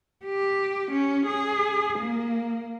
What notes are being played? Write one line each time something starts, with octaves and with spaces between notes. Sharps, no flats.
G4
C#4
G#4
A#3